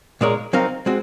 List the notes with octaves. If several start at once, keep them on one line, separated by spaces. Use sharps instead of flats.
A#2 G#3 D#4 A#4 C#5
F#3 C4 D#4 A#4 F5
G#3 C4 F#4